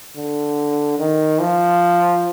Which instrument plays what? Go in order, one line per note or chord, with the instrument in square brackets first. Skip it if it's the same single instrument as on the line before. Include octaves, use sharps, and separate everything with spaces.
[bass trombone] D3
D#3
F3